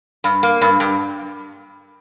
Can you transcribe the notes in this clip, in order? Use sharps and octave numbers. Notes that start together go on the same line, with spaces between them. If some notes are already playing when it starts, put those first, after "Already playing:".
G2
A#3
G2
G2